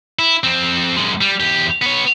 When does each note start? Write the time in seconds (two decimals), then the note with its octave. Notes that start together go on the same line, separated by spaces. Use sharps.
0.19 E4
0.44 F2 C4
0.96 F#2 G#3
1.21 G3
1.40 E2 G4
1.82 B3 C#5